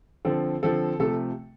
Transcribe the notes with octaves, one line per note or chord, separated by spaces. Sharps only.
D3 F3 C4 A4
D3 F3 C4 A4
C3 F3 A3 A4